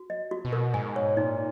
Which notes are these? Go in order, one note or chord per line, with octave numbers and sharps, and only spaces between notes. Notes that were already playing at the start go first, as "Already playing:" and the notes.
Already playing: F#4
D#5
F#4
B2
A#4
G#2 G#5
C#5
A#2 D#4